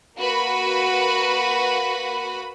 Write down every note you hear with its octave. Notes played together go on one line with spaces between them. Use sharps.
A#3 F#4 B4 B5